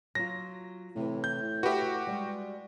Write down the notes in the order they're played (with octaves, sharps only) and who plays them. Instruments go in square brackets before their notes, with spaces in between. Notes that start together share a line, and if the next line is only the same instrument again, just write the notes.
[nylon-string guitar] F#3 F4 [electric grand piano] A#6
[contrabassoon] A2 [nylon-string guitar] C3 E3
[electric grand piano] G6
[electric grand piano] F#4 G4 [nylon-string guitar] B4 E5
[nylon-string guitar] G3 G#3